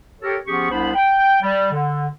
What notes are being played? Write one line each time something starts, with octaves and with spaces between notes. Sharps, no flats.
G4 A4 A#4 C#5
F3 B3 C#4 G4 G#4 C#6
C2 B3 D4 C5 B5
G5
G3
D3